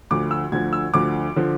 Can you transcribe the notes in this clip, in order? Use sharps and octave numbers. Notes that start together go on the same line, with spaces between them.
D2 D3 F3 D6
E6
D2 D3 F3 G#6
E6
D2 D3 F3 D6
D3 F3